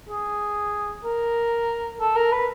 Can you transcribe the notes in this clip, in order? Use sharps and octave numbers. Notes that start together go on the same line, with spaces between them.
G#4
A#4
A4
A#4
B4